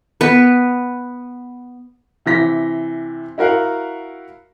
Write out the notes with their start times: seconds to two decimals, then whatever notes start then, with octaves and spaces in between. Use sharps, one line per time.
0.21 B3 B4
2.26 C3 E3 A#6 B6
3.38 E4 F#4 A#4 F5 F#5